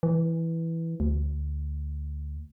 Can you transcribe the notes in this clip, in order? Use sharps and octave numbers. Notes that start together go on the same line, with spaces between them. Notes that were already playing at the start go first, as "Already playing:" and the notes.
E3
D2